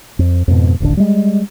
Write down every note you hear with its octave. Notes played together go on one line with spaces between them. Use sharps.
F2
F2 G#2 B2
D#1 A1 D3 D4
G3 G#3